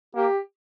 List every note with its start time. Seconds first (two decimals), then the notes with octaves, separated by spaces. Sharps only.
0.15 A#3 G4